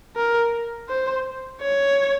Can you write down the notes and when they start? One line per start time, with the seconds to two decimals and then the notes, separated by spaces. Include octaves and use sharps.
0.16 A#4
0.89 C5
1.62 C#5